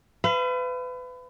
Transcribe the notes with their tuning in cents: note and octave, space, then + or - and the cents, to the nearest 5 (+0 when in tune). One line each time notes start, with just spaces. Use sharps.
B4 +30 F5 -40